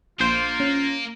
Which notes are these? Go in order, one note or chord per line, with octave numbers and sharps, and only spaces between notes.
A#1 A#3 F4 C5
C#4